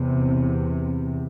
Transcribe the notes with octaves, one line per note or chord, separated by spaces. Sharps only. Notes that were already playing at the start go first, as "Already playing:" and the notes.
Already playing: E2 C3